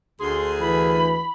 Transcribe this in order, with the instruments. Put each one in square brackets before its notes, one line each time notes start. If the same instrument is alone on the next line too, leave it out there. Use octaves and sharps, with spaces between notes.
[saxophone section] D2 G#4 [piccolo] C6
[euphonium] E3 [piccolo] B5